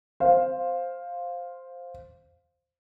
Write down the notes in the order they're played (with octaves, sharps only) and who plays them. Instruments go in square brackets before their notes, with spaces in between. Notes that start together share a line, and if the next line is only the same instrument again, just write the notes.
[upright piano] C5 F5